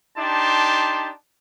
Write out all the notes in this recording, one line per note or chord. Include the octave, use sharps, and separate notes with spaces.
D4 D#4 G4 A5 C6